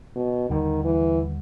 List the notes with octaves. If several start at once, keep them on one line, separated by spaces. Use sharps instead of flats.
B2
D#2 D3 D#3 G3
E3